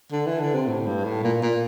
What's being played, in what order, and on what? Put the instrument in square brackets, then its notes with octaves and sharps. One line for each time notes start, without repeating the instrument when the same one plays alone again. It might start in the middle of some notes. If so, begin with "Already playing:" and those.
[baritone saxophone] D3
E3
D3
C3
A2
G2
A2
A#2
A#2